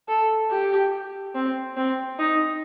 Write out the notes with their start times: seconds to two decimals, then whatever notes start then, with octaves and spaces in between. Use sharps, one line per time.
0.08 A4
0.50 G4
1.35 C4
1.77 C4
2.19 D#4